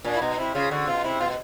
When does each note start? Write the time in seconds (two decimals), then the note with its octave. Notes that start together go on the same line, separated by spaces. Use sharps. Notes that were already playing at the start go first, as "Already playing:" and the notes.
0.04 A#2 D4
0.16 E4
0.21 B2 D#4
0.38 C3 E4
0.54 C#3 F4
0.70 D3 F#4
0.87 B2 F4
1.04 C3 E4
1.20 B2 F4